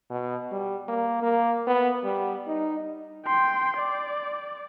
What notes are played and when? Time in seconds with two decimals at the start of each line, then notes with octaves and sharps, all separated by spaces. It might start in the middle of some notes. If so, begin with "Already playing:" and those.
0.11 B2
0.52 G3
0.89 A#3
1.23 A#3
1.67 B3
2.04 G3
2.47 D#4
3.27 G5 C6
3.77 D5